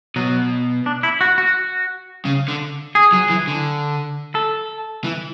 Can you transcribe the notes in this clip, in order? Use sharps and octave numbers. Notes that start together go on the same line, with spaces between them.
B2 F#3
D4
E4
F#4
F#4
C#3
D3
G#4
F#3
E3
D3
A4
E3